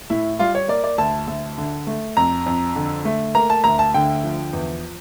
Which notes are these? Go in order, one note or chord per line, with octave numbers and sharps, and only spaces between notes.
A2 E4
G3 F4
C#5
A#3 D5
D5
D2 A5
D2
D3
A3
F2 A#5
F2
D3
A3
A#3 A#5
A5
D2 A#5
A5
D3 G5
F3
E2